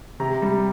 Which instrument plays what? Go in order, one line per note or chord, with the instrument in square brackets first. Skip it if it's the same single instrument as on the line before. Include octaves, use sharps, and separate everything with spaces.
[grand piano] C3 A#5
G3